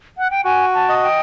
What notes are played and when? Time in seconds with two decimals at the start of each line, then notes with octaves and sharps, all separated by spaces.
0.18 F#5
0.31 G5
0.45 F#4 G#5
0.74 A5
0.89 D#5
1.03 G5